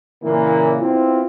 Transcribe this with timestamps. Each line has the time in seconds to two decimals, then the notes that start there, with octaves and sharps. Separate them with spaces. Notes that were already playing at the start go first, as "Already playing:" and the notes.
0.24 A#2 C#3 E3 A#3
0.80 B3 C4 E4 F4